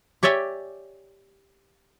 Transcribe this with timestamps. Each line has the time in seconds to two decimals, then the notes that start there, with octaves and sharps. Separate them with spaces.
0.23 G4 C#5 D5 E5 G5 G#5